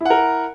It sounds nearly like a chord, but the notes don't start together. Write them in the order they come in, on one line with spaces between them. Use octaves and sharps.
E4 F#5 A#4